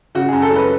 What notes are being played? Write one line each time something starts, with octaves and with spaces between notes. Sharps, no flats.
C#3 F#4
F#2 G#4
A4
F#3
B4